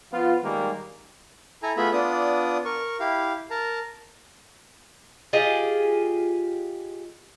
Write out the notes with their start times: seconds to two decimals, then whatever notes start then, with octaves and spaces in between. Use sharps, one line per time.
0.13 F3 B3 F4
0.43 D#3 G3 G#3 A#3
1.63 E4 A4 G#5 A#5
1.77 A3 B3 F4 G#4 E5 B5
1.93 B3 D4 F4 D5 D#6
2.65 A#4 C#6
3.00 E4 G4 F5
3.50 A#4 A5 A#5
5.33 F4 G4 G#4 D#5